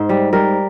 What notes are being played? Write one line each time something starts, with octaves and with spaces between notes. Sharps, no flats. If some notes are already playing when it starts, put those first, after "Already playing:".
Already playing: G#2 C5
G3
G3 A#4